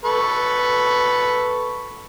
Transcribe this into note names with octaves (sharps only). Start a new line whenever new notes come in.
A4 B4 C#6